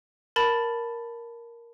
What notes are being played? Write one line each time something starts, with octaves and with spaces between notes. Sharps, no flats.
A#4 A5 B5 A6